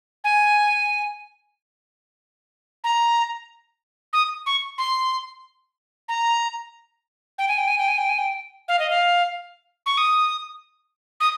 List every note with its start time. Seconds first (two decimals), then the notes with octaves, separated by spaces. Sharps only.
0.24 G#5
2.84 A#5
4.13 D#6
4.46 C#6
4.78 C6
6.09 A#5
7.38 G5
7.48 G#5
7.58 G5
7.68 G#5
7.79 G5
7.88 G#5
7.98 G5
8.09 G#5
8.18 G5
8.68 F5
8.79 D#5
8.90 F5
9.86 C#6
9.98 D#6
11.20 D#6